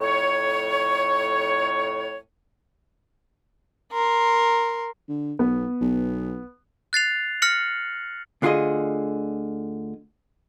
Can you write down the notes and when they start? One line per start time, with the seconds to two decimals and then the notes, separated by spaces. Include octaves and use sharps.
0.01 F2 A2 C#5
3.92 A#4 C6
5.09 D3
5.39 B1 B3
5.81 B1
6.93 F#6 A6 C7 F7
7.42 F6 A#6 C#7 F#7
8.42 D2 D3 F4 F#4 G#4 D#5